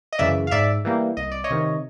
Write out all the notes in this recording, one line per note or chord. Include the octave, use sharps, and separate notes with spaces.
D#5
F#2 C#3 E3 D5 E5
F5
G#2 D5 E5
E3 G3 A#3
C2 D#5
D5
C#5 D#5
C3 D#3